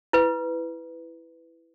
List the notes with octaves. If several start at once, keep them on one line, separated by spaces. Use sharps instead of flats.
E4 B4